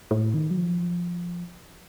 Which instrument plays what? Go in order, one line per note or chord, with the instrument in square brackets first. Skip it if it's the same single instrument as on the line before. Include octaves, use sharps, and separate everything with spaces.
[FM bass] A2
D#3
F#3
F3